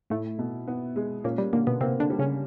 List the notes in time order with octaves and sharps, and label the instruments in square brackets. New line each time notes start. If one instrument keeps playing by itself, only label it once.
[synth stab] A2 A3 [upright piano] E4
[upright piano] B2
B3
G#3
[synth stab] A#2 A#3 [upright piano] C#4
[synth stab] G3
[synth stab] A#2 A#3 [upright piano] D3
[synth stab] B2 B3
[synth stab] C3 C4 [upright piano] A#3
[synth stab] D3 D4
[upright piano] G3
[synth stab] C#3 C#4